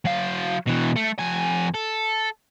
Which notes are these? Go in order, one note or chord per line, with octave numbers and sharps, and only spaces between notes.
F#3 F5
B2 E3
A3
F2 G#5
A4